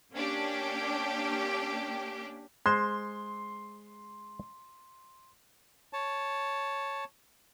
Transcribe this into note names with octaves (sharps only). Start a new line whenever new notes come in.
A#3 C#4 D4 G4
G#3 C5 C6
C#5 A5